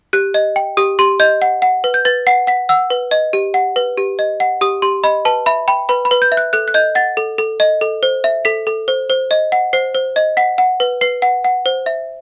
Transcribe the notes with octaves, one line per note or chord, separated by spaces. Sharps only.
G4 F#6
D#5
G5
G4 D#6
G4 C6
D#5 G6
F#5
F#5
B4
G6
B4 A6
F#5 C7
F#5 B6
F#5 E6
B4
D#5
G4
F#5
B4
G4
D#5
F#5
G4 D#6
G4 C6
D#5 B5
B4 A5
E5 B5
G5 B5
B4 B5
B5
B4
G6
E5
F#6
A4 F#6
F#6
D#5 G6
F#5 A6
A4
A4
D#5
A4
C5
E5
A4 B6
A4
C5
C5
D#5
F#5
C5 C7
C5
D#5
F#5 B6
F#5
B4
B4 C7
F#5
F#5
C5
E5